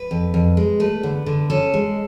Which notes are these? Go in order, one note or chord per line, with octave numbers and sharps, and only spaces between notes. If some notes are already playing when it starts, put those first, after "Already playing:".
Already playing: B4
F2
F2
G#3
A3 B4
D3
D3
C#4 A4
G#3